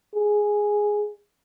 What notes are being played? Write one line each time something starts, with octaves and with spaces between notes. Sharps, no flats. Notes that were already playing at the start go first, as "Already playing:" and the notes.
G#4